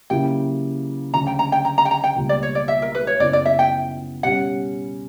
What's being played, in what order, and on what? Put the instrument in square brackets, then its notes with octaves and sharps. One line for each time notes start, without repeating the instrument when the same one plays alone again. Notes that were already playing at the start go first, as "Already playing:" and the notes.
[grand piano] C#3 F#3 A#3 E4 G4 [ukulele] G5
[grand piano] D2 C#3 F#3 [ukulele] A#5
[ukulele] G5
A#5
G5
A#5
A#5
G5
A#5
G5
[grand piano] C#2 B2 G3 A#3
[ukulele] D5
C#5
D5
E5
A#4
B4
C#5
[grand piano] F#2 C#3 F#3 B3 E4 [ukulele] D5
[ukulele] D5
E5
G5
[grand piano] B2 G3 C#4 G4 [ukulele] F#5